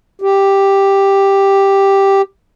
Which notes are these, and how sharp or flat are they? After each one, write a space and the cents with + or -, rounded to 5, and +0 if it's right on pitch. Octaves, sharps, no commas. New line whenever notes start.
G4 +0